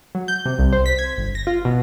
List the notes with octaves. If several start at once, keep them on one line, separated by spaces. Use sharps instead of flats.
F#3
G6
C3
C2
C5
B6
G#6
G1
A#6
F4
B2